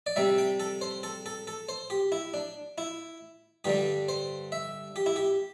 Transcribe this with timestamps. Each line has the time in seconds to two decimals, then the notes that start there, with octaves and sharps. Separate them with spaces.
0.07 D5
0.16 C3 G3 E5
0.38 G5
0.60 A4
0.81 C5
1.03 A4
1.26 A4
1.47 A4
1.69 C5
1.90 G4
2.12 E4
2.34 D4
2.78 E4
3.65 G2 D3 G3 G4
4.09 C5
4.52 E5
4.96 G4
5.06 E4
5.16 G4